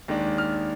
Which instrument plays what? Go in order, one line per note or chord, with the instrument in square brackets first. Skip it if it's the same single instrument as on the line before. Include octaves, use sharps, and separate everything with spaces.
[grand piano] D#2 D#3 G#3 D4
F6